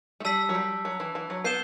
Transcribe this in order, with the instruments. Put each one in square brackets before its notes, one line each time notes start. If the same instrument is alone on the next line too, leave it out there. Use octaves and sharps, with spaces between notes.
[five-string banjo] A3
[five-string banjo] G3 [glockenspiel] A5 E6 B6
[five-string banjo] F#3
G3
F#3
E3
E3
F#3
[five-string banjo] B3 [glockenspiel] G6 C7 E7 G7